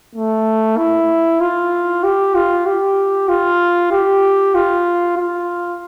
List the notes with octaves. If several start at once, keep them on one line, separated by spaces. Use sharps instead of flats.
A3
E4
F4
G4
F4
G4
F4
G4
F4
F4